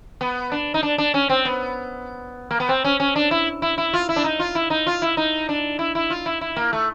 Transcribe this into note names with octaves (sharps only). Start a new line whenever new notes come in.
B3
D4
D#4
D4
D4
C#4
C4
B3
A#3
B3
C4
C#4
C#4
D4
E4
E4
E4
F4
E4
D4
D#4
F4
E4
D#4
F4
E4
D#4
D4
E4
E4
F4
E4
E4
A#3
A3